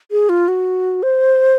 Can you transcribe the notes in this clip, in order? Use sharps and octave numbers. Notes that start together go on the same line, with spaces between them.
G#4
F4
F#4
C5